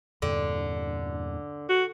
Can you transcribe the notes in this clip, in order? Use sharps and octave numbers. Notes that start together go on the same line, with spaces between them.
E2 G2 A#2 D3
F#4